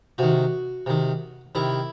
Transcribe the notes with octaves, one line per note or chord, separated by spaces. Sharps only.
C3 D#3 F#4
C3 D#3
C3 D#3 E4